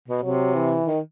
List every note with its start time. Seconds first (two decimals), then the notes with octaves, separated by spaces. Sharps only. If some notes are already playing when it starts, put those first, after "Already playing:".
0.08 B2
0.23 C3 F#3
0.54 E3
0.86 D#3